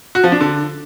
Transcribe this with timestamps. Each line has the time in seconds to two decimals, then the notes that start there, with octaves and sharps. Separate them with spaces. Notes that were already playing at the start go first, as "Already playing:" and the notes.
0.15 F#4
0.24 F3
0.32 D4
0.41 D3